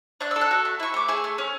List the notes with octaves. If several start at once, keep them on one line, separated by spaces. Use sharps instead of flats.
D4 F#6
E6
A4
F#6
F#4
A3
E4 C#6
A3 D6
G#4 E6
A3
C#4